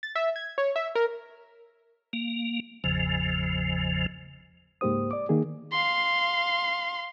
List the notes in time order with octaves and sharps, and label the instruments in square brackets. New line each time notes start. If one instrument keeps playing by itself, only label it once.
[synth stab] A6
E5
G#6
C#5
E5
A#4
[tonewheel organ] A#3
G#1 E2 C#3 F3
[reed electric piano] C#2 G#2 A#3 G4 C5 D#6
D5 D6
D#3 A#3 G#4
[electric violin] F5 C6